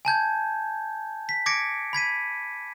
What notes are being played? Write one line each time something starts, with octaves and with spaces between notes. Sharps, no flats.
G#5 A5 G6 G#6
B6
D6 G#6 A#6 C#7 D7
B5 G#6 B6 D#7